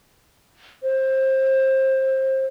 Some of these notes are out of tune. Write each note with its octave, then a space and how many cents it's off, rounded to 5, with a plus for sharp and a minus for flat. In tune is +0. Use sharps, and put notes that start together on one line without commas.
C5 +25